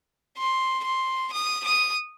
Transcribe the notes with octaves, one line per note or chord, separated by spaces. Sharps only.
C6
C6
D#6
D#6